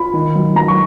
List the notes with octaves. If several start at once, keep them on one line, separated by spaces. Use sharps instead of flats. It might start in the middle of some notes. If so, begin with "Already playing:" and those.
Already playing: F4 B5
D#3
F#3
F#3 A#5
C#6